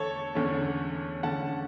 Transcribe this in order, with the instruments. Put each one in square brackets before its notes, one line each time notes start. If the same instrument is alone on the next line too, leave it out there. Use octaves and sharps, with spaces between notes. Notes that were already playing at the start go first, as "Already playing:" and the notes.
Already playing: [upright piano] E2 D3 A3 A4 C#5
E2 D3 A3 C#4
E2 D3 A3 C#4 F#5 A5